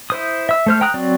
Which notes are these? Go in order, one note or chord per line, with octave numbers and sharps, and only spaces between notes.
E4 C5 D#6
E5 E6
A3 C5 F6
G5 A#5 D#6 F#6
F#3 C4 D5